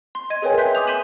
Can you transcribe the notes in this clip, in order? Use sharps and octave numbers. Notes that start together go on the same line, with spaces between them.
C6
D#5 G#6 D#7
G#4 A#4 B4 C#5 G5 G#5
E5 C6 F#6 G6 B6
G#5 D6 D#6 F7
C6 G6 B6 D#7 E7 F#7